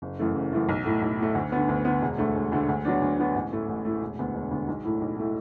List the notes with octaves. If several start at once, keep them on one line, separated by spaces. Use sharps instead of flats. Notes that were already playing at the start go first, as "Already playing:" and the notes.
F#1
F#2 E3 A3
F#1
F#2 E3 A3
B1
A2 A3
B1
A2 A3
D2
D3 B3
D2
D3 B3
E1
D2 D3 A3
E1
D2 D3 A3
D2
D3 F#3 B3 D4
D2
D3 F#3 B3 D4
A1
A2 A3
A1
A2 A3
E1
D2 D3 B3
E1
D2 D3 B3
B1
A2 A3 E4
B1
A2 A3 E4